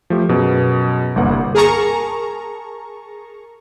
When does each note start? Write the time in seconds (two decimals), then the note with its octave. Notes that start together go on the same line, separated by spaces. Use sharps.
0.10 F3 A3 G4
0.29 F#2 B2 G#4
1.16 G1 C2 A#3 F#5
1.55 G#4 A#4 A5 A#5 C#6